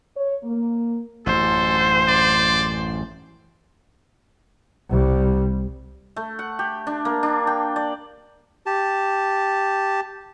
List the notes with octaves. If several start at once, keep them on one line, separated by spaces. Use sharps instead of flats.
C#5
A#3
A1 F#2 A4 C5
D5
C2 G3
A3
F#5
G4
D4
A#3
D4
G5
D5
G4 A5